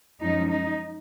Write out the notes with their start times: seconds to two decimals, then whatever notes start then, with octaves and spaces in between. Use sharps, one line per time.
0.22 F#2 F3 G#3 C#4 D#4
0.50 D#4